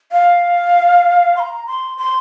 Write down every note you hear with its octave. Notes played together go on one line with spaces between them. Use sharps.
F5
C6
A#5
C6
C6